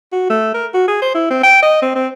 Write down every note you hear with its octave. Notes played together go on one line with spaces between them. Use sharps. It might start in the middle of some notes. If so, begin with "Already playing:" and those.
F#4
A3
A#4
F#4
G#4
C5
E4
C4
G5
D#5
C4
C4